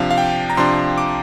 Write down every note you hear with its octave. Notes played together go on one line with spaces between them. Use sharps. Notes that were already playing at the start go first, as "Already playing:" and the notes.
Already playing: C3 F3 D4 F5
F5
G5
A#5
C3 F3 D4 C6
D6